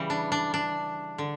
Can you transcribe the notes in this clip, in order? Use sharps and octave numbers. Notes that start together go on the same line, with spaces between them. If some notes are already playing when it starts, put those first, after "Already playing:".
Already playing: C#3 E3 G3
D4
D4
D4
D3